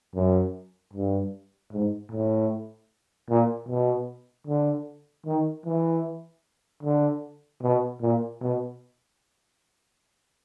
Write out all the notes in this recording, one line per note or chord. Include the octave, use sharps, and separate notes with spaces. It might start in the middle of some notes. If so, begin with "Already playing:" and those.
F#2
G2
G#2
A2
A#2
B2
D3
D#3
E3
D3
B2
A#2
B2